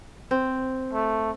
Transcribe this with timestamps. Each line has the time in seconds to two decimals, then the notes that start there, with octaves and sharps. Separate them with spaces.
0.31 C4
0.93 A3